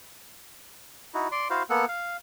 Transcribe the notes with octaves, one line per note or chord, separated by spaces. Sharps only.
D#4 E4 F#4
D5 C6
E4 F#4 C5 F5
A#3 B3 A4 F#5
F5